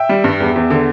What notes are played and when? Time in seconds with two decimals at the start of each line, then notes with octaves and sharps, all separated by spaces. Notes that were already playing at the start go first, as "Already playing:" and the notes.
Already playing: E5 G5
0.09 G3
0.24 G2
0.40 E2
0.56 E2
0.70 D3